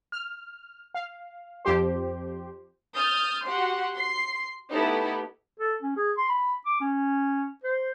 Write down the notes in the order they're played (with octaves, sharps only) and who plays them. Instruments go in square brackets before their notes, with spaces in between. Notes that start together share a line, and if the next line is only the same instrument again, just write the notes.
[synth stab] F6
F5
F2 F3 G4 C5
[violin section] D#6 F6 G6 A6
F#4 G4 F#5 C6
C6 C7
A3 B3 D#4 E4 G4 A4
[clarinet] A4
C#4
G#4
C6
B5
D6
C#4
C5